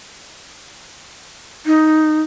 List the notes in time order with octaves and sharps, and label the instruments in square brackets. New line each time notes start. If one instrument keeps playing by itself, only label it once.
[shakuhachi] D#4